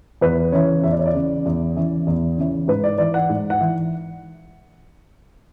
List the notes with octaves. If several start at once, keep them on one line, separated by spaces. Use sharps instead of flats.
E2 B4
C#3 E3 C#5
E2 E5
D5
C#5
D5
C#3 E3
E2
C#3 E3
E2
C#3 E3
G#2 B4
D5
E3 D5
F#5
G#2
F#5
E3